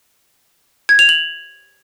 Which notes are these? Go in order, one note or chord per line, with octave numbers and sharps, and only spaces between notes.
G#6
F7
F#7